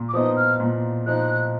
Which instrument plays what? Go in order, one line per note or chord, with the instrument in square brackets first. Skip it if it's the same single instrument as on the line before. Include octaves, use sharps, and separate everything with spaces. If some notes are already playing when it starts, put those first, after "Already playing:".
Already playing: [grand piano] A#2
[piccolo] D6
[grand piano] F3 B3 D#4 [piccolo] D#6
[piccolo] F6
[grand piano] A#2
[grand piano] F3 D#4 [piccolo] F#6